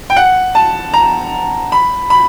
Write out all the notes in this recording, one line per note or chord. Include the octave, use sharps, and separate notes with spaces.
G5
F#5
A5
A#5
B5
B5